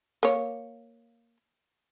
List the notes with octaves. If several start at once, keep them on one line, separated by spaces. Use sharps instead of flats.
A#3 C#5